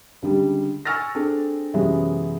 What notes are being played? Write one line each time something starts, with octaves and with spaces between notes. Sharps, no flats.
C#2 D3 G3
G#5 C#6 E6 F6 A6 A#6
C4 D4 G#4 A4
F#2 C3 E3 F#3 G#3 B3